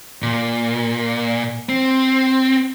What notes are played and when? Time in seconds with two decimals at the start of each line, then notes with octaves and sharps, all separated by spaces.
0.22 A#2
1.69 C4